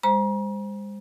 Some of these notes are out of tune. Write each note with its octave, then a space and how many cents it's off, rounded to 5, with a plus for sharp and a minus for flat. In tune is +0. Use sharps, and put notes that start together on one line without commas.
G#3 -40 C5 +0 A#5 +35